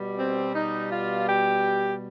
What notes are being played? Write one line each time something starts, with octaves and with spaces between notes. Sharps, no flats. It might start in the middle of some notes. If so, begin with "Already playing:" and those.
Already playing: B2 G3
C4
D#4
F4
G4